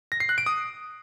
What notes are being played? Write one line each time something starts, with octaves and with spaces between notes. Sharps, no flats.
A#6
C7
F#6
D7
D#6